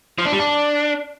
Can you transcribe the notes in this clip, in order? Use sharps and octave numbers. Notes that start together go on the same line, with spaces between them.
F3
D4
G3
D4